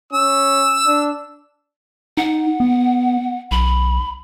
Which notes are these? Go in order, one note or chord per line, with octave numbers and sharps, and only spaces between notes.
C#4 E6
D4
D#4 F#5
B3
B1 B5